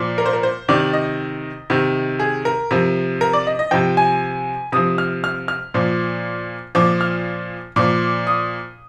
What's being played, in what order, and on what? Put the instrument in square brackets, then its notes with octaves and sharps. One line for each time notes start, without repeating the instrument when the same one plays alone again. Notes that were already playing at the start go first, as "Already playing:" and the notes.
Already playing: [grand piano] A#2 F3
A#4
C5
A#4
C5
C3 D#3 D5
D#5
C3 D#3
G#4
A#4
C3 F3
A#4
D5
D#5
D#5
C3 F3 G5
G#5
C3 F3 D#6
F6
F6
F6
A#2 F3
A#2 F3 D6
F6
A#2 F3 D6
D#6